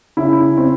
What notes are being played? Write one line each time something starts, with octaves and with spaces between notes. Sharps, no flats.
C#3 E4
C4